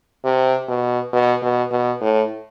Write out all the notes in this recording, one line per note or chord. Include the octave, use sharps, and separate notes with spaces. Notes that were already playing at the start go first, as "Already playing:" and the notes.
C3
B2
B2
B2
B2
A2